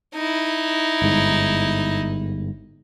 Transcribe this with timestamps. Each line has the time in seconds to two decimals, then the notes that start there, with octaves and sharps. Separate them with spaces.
0.14 D#4 E4
1.02 G1 G#2